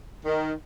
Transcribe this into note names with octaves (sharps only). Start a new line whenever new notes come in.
D#3